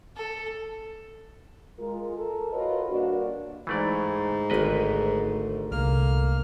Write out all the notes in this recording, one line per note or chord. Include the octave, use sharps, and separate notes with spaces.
A4
G#3 F4 A#4
A4 A#4
F4 F#4 A#4 B4 C#5 D#5
G2 A#3 D4 F#4
G#2 E3 A3 D5
G#1 D3 A3 B4 D#5
C2 A#3 D4 F6